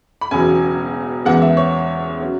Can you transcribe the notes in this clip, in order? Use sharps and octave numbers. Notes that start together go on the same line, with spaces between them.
B5
E1 E2 C#3 F#3 G#5
E2 C#3 E3 G#3 B3 F#5
E5
C#5
F#3 C#4